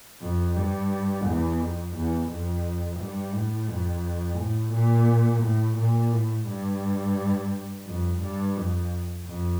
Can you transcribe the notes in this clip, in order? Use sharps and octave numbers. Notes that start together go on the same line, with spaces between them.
F2
G2
E2
F2
E2
F2
G2
A2
F2
A2
A#2
A2
A#2
A2
G2
F2
G2
F2
F2